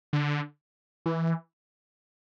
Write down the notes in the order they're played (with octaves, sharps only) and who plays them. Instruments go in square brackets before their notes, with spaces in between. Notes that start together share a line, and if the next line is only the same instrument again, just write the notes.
[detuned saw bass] D3
E3